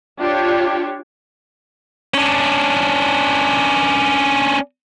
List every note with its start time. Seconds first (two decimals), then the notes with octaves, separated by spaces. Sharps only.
0.20 D4 F4 G4 C#5
2.14 C#4 D4